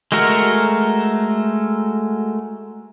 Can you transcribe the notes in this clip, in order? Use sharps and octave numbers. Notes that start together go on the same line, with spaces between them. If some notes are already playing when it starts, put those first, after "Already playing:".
G#3 A3 F#4 A#4